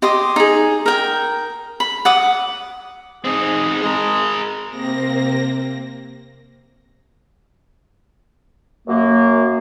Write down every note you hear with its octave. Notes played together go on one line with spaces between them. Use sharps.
G4 D#5 C6 D#6
D#4 G#4
A#4 G5
B5
F#5 D6 D#6
C4 D#4 G#4
G#3 G#4 A#4
C3 A#3 C4 A#6
F#2 A#3